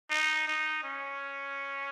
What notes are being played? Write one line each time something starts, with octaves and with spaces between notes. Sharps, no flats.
D#4
D#4
C#4